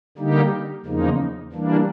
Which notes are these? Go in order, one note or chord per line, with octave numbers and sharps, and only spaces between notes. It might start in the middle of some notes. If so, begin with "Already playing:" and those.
D3 G3 A#3 D#4 G4
E2 C#3 F3 A#3 D#4
E3 G3 A#3 D4